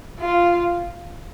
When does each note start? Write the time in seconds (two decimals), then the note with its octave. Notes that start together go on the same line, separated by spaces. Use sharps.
0.20 F4